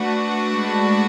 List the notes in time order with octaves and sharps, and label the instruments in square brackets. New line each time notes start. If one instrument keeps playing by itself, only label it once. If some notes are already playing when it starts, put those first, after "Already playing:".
Already playing: [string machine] A3 [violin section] D4 F#4 B4 F#5
[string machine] G#3